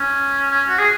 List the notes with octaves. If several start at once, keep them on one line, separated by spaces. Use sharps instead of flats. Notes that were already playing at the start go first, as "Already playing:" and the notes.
Already playing: C#4
C#4
F#4
G#4